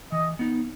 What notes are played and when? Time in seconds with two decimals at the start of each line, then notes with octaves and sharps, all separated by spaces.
0.12 E3 D#5
0.39 B3 D#4